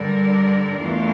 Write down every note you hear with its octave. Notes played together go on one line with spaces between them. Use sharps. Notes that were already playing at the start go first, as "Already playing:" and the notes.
Already playing: G2 D3 G3 A#4 D5
E2 E3 A3 D4 F4